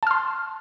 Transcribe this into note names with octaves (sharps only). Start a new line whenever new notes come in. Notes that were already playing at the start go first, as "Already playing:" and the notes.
A5 C6 F6